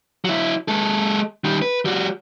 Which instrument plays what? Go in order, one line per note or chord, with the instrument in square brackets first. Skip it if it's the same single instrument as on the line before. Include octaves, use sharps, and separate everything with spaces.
[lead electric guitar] F#3 E4
G#3 A4
D#3 G3
B4
G3 F#4